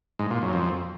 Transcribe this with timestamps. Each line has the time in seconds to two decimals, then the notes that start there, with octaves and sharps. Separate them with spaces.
0.19 G#2
0.31 A#2
0.42 F#2
0.53 F2